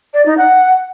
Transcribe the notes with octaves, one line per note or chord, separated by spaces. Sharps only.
D5
D#4
F#5